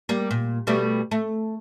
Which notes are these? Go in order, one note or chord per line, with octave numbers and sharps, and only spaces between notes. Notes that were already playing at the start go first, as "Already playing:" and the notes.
G3 A#3
A#2
B2 G3 A3
A3